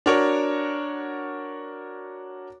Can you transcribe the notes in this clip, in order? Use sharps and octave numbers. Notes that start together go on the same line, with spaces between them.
D4 F#4 A#4 C#5